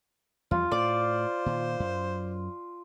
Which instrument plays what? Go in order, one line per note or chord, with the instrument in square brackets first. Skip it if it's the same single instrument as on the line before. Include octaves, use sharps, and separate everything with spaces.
[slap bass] E2 F3 G3 [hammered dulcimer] F4
[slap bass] A2 [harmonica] C5 [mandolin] D5
[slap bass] A#2 D#3
F#2